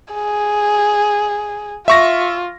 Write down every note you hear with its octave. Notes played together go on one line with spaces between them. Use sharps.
G#4
F4 E5 C#6 A#6